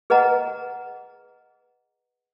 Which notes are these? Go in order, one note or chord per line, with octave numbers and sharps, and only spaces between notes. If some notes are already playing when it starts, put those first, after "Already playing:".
G#4 B4 D#5 F#5 A#5